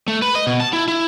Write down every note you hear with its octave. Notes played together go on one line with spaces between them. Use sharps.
A3
B4
D#5
B2
A5
E4
E4